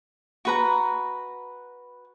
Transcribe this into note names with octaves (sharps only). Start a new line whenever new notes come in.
F#4 B4 A#5